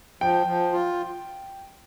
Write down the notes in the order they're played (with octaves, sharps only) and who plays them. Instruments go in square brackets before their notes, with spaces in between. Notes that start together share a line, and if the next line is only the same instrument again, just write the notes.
[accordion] F3 [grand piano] G5
[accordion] F3
F4